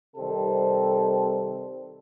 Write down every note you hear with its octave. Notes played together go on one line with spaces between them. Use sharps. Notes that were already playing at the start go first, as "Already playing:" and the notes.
C3 D#3 G3 C4 A4